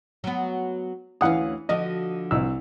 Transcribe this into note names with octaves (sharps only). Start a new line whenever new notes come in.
F#3 B3
D2 E3 C#4 F5 F#5 D#6
D3 F3 F#4 D#5
C2 E6